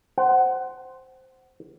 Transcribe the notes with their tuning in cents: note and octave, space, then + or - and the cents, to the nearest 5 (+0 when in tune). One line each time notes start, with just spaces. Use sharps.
C5 +0 F#5 +20